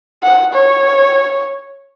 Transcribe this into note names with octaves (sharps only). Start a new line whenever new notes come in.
F#5
C#5